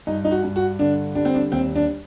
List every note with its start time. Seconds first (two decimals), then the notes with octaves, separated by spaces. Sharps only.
0.07 G2 D#4
0.25 D#4
0.31 F#4
0.44 G2
0.56 F#4
0.79 D3 D4
1.15 G3 D4
1.25 C4
1.34 D4
1.52 D#2 C4
1.76 D4